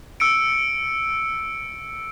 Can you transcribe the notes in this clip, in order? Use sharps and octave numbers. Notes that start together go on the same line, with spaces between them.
E6 C#7 D7